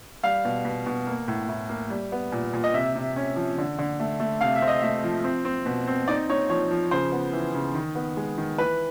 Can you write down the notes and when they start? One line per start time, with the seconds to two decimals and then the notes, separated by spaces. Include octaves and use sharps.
0.23 G3 F5
0.45 B2
0.65 B2
0.86 B2
1.07 A#3
1.28 A2
1.49 A2
1.69 A#3
1.90 G3
2.12 B3
2.32 A#2
2.54 A#2
2.64 D#5
2.74 C3 E5
2.95 C3
3.16 C#4
3.36 F3
3.58 D3
3.79 D3
4.00 A3
4.20 A3
4.41 C3 F5
4.55 E5
4.62 C4
4.68 D#5
4.81 A3 E5
5.04 F3
5.24 C4
5.45 C4
5.66 B2
5.87 C4
6.08 D#4 D5
6.30 D#4 C#5
6.49 F3 C#5
6.71 F3
6.91 C#3 C5
7.12 B3
7.33 E3
7.55 C#3
7.75 D#3
7.95 B3
8.17 G#3
8.38 D#3
8.58 E3 B4